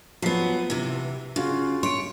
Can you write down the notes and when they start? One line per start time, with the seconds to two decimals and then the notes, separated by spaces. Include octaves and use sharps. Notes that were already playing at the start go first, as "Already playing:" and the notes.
0.22 F3 F#3 B3 B6 C7
0.70 C3 E3
1.36 C#3 F4 F#4
1.83 C#5 C6 D7